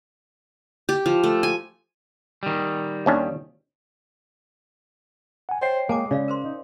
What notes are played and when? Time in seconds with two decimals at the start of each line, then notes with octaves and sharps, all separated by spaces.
0.89 G4
1.06 F3
1.24 A3
1.43 G#5
2.43 D#3 G3
3.06 D#2 C#4 D4
5.49 F#5 G#5
5.62 C5 C#5 D#5 G5 C7
5.89 G#3 A#3 G#5 A5 D6
6.11 C#3 C#4 C#5 D5 F5
6.28 A#4 C5 C6
6.43 D#4